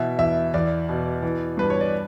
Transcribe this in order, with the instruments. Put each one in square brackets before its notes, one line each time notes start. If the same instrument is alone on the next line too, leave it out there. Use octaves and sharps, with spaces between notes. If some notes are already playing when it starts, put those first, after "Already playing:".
Already playing: [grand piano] B2 E3 E5
E2 E5
E2 D5
B2
E3
G2 B4
C#5
D5